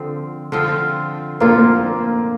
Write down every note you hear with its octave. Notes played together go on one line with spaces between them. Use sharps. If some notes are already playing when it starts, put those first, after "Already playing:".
Already playing: D3 F3 C4
D3 F3 C4 F4
D3 F3 A#3 C4 F4